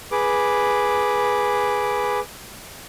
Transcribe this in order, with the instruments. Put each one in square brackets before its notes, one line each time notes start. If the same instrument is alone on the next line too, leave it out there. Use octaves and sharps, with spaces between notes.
[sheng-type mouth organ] G#4 B4 D6